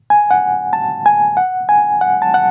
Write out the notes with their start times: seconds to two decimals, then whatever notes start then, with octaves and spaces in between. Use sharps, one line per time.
0.10 G#5
0.31 F#5
0.73 A5
1.06 G#5
1.37 F#5
1.69 G#5
2.01 F#5
2.22 A5
2.34 F#5